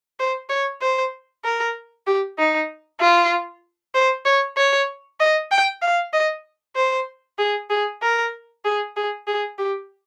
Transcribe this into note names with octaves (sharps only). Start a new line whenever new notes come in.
C5
C#5
C5
A#4
G4
D#4
F4
C5
C#5
C#5
D#5
G5
F5
D#5
C5
G#4
G#4
A#4
G#4
G#4
G#4
G4